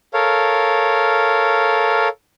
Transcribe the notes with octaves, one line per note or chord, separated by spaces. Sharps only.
A4 A#4 C#5 F5